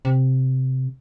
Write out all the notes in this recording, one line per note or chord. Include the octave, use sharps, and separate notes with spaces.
C3